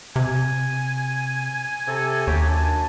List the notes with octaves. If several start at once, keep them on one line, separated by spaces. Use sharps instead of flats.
C3 G#5
C3 A4
D#2 F#3 F#4 G4
F#2 D4 A5